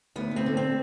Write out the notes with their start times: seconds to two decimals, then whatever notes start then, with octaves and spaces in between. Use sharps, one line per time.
0.16 D2 B3
0.31 D2
0.36 C4
0.46 D3
0.57 C4